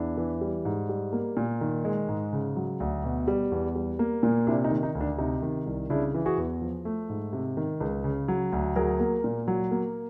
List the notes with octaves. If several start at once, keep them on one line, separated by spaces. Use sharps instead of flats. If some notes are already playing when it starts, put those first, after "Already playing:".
Already playing: E2 D4 E4
E3
G3
G#2
G3
A#3
A#2
D#3
G#3
G#2
C#3
F#3
D2
B2
G3
E2
G3
A#3
A#2
C3 D4 E4
D#4
D#3
D#4
D2
D4
C3 D#4
D#3
C2
C#3 D4 E4
E3
F#4 G#4
E2
F3
A3
G#2
C3
D#3
C#2
C#3
F#3
D2
F#3 G#4 A#4
A#3
A#2
F#3
A#3